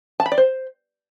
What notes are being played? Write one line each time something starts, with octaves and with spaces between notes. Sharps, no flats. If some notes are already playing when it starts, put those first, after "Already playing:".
A5
B5
D5
C5